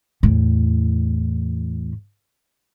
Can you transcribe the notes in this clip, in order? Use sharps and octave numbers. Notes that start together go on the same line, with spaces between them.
E2 A2